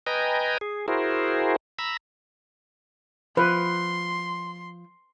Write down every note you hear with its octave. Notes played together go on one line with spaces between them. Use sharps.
B4 D#5 G5 G#5 A#5
G#4
E4 F#4 G#4 A#4 C5
A#5 B5 E6
F3 B4 C6